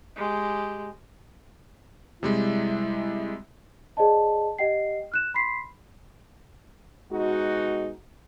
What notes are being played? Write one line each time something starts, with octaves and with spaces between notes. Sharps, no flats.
G#3 G4
C3 G3 G#3 E4
G#4 C5 D5 D#5 A5
G4 D#5 F#5 G5 C7
F6 F#6 E7
B5 C6 B6 C7
B2 G#3 D#4 F#4